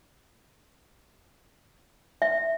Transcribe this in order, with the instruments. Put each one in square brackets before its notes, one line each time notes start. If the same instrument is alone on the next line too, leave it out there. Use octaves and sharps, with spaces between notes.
[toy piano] E5